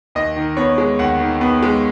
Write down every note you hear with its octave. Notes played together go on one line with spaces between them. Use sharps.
D#2 D#5
D#3
B3 C#5
G#3
D#2 F#5
D#3
B3
G#3